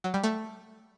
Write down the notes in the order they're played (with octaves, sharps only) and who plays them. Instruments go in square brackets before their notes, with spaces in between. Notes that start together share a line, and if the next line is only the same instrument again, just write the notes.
[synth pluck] F#3
G3
A3